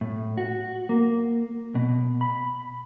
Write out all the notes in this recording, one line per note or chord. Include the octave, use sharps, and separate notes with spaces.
A2
F#4
A#3
B2
B5